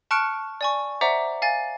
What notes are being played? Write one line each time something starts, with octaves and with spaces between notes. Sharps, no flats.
A5 C#6 F6 F#6 C#7 D7
D5 G#5 C#6
C5 D5 E5 F#5 A#5 D6
F5 G#5 A6